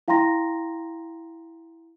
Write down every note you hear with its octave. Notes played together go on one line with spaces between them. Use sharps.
E4 F5 G5 A#5 C6 A#6